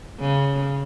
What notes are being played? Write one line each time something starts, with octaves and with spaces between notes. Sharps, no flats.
C#3